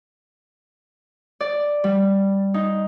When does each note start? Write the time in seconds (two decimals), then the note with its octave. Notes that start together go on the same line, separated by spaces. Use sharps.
1.41 D5
1.84 G3
2.54 D#4